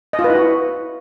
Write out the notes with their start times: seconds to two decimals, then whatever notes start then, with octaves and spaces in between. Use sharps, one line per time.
0.13 D#5
0.19 F4
0.24 B4
0.30 E4
0.35 F#4